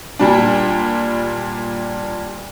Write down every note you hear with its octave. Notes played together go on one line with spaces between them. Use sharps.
A#2 G3 D4